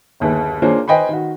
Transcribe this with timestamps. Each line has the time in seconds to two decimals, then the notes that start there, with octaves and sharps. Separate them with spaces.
0.20 G1 D#2 G#4 B4
0.62 A#3 D4 F4 G#4 C5 C#5
0.88 B4 C5 D#5 G5 G#5 B5
1.09 D#3 F#4